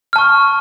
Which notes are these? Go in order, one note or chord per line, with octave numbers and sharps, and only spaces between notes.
A5 C#6 F6